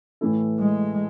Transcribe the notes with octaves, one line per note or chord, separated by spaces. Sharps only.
A2 E3 A3 E4 A4
G#3